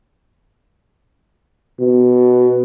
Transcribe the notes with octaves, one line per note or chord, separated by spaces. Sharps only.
B2